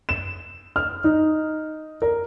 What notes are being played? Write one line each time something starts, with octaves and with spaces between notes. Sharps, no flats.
E7
F6
D#4
A#4